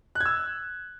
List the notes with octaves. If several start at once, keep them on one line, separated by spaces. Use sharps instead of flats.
F#6
G#6
E6